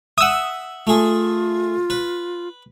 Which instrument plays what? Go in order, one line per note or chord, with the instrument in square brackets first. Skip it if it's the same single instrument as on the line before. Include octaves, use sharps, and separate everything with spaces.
[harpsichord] E5 F#5 [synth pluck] D#6 E6
[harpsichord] A3 G#4 [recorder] F4
[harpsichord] B4